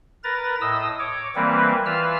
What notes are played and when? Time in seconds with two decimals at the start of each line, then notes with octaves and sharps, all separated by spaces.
0.24 A#4 B4 A#5 A6
0.61 A2 D#5 D#6 E6
0.99 C#5 D6
1.36 E3 G3 A#3 C4 A#4 B4
1.86 E3 F4 B4 E6 F6